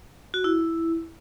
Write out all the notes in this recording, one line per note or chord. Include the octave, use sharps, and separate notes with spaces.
F#4
E4